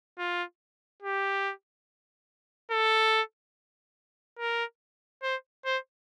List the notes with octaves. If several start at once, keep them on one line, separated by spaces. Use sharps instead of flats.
F4
G4
A4
A#4
C5
C5